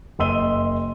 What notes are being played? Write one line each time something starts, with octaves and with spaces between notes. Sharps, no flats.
F#1 D#5 C6 E6 D#7 G7